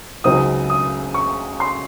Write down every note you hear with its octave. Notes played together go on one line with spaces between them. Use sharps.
C#2 C#3 F#3 C4 D#4 D#6
D#6
C#6
C6